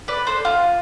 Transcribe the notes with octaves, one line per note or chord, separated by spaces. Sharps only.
B4 D5
A4 C5
F4